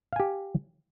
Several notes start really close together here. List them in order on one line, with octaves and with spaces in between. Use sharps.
F5 G#5 G4